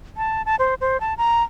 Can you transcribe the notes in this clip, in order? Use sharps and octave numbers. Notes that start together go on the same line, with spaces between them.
A5
A5
C5
C5
A5
A#5